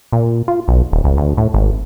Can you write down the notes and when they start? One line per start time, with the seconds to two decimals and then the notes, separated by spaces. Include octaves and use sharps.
0.12 A#2
0.48 F4
0.68 B1
0.92 D#1
1.04 C#2
1.17 D2
1.37 A2
1.54 G#1